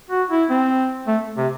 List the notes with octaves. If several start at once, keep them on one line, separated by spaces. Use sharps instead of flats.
F#4
E4
C4
A3
C3